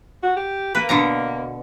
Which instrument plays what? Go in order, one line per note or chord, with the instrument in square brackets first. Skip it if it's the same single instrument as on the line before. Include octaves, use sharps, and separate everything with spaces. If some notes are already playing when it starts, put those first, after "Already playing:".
[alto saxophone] F#4
G4
[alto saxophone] A#3 [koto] B4
[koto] B2 D3 A#5